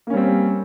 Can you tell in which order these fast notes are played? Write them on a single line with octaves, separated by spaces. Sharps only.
A#3 C#4 G3 C4